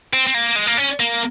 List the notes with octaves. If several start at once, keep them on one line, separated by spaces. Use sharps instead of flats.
C4
C4
A#3
G#3
A#3
C#4
A#3